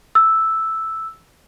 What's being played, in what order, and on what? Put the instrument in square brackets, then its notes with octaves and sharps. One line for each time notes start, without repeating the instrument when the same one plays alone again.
[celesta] E6